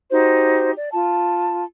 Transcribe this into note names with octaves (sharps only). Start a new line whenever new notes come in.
D#4 F#4 G4 C5
D5
F4 A5